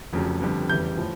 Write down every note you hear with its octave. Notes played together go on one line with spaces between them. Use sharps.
F1 F2 C#3 F#3
G1 F2 D3 G3
F1 E2 C#3 E3 G3 G6
A2 F3